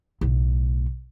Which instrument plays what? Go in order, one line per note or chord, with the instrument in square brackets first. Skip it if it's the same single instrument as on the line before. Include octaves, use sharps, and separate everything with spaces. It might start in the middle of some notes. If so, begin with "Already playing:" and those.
[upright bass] B1 A2